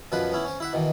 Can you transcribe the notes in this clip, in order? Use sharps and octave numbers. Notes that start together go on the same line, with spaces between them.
F#2 B2 F3 B4 C5 F#5
B3 C#4 E4
C#4 C5
E4 E5 F#5
B2 D#3 E3